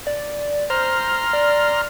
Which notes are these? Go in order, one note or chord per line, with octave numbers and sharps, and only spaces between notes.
D5
C5 A#5 C6 F6
D5